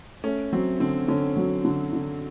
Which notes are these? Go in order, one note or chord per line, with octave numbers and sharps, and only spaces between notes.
A3 C#4
F#3 C4
D3 C4
D3 C#4
F#3
D3
D3